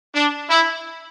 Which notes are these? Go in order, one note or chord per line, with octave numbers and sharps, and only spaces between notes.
D4
E4